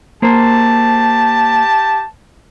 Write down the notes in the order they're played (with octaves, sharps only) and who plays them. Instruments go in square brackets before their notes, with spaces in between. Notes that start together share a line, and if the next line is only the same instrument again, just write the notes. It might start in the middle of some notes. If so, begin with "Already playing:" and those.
[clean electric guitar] A#3 C5 [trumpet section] G4 A5